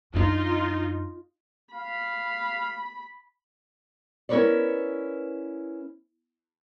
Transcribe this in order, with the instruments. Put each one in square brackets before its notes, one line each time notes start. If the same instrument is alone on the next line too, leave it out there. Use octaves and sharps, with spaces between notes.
[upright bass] F#2 D4 [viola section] D#4 F4
[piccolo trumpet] F5 [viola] B5
[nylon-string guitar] C#4 E4 A#4 B4 C#5 D5